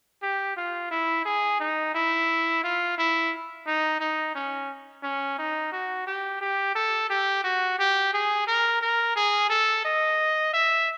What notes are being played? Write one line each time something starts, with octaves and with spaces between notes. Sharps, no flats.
G4
F4
E4
G#4
D#4
E4
F4
E4
D#4
D#4
C#4
C#4
D#4
F#4
G4
G4
A4
G4
F#4
G4
G#4
A#4
A#4
G#4
A4
D#5
E5